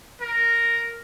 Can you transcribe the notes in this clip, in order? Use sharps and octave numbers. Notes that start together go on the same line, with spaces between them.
A#4